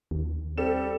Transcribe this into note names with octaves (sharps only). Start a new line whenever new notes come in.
D#2
G3 C4 A4 E7